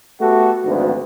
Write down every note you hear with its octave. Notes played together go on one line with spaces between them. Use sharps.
A3 B3 F#4 G4 A4
G#1 D2 F3 B3 D4